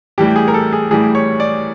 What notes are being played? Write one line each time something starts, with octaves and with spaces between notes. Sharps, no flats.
A2 E3 G3 G4
G#4
A#4
A4
G#4
A2 E3 G3 G#4
C#5
D5